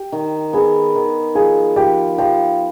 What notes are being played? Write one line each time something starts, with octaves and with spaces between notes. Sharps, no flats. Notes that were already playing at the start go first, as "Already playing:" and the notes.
Already playing: G4 G5
D#3
B3 G#4 G#5
D#3
F3 G#4 G#5
F3 G4 G5
F3 G4 G5